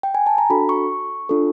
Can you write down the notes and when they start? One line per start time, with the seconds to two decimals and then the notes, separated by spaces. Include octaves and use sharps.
0.03 G5
0.15 G#5
0.27 A5
0.38 A#5
0.50 D4 F#4 A4 B5
0.69 C#6
1.29 D4 F4 A4